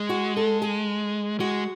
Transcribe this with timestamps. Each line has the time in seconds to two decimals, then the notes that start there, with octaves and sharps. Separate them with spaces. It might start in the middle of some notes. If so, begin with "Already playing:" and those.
Already playing: G#3
0.09 F#4
0.37 A4
0.62 G#4
1.40 G#3 F#4